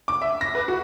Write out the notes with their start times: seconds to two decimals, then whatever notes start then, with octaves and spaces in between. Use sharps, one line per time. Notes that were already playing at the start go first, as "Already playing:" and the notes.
0.08 D6
0.22 E5
0.41 A#6
0.55 B4
0.68 F#4